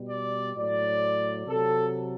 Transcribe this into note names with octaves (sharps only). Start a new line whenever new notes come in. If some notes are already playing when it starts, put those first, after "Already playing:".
Already playing: B2 G3
D5
A2 F#3 D5
C3 F#3 A4